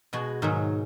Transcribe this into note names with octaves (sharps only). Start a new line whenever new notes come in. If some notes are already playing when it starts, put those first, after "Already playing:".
B2 G#3 F#4
G#2 D#3 F#3